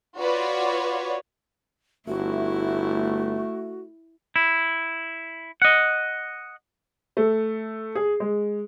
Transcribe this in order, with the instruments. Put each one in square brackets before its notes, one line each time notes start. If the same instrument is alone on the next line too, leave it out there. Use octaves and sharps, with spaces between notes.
[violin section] F4 F#4 B4 C#5 D5
[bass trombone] G1 [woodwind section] A3 [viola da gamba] E4 [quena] F#4
[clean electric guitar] E4
D#5 F#5
[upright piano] A3
G#4
G#3